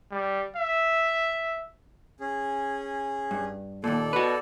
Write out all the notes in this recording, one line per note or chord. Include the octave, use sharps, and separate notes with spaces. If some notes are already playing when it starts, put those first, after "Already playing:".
G3
E5
C#4 G#4
G2
D#2 A#2 A4 D5
F#4 B4